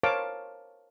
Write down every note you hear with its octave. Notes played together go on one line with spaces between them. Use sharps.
A#4 C5 C#5 F5 A5 D6